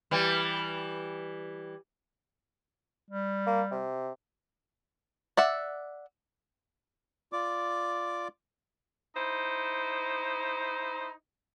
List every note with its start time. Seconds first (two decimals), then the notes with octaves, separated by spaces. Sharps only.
0.11 E3 G3
3.10 G3
3.46 A#3
3.71 C3
5.37 D5 E5 F#5
7.33 F4 D5 D6
9.16 D#4 E4 C5